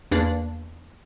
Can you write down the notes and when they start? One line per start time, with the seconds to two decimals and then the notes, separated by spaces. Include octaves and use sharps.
0.11 E2 A#3 D4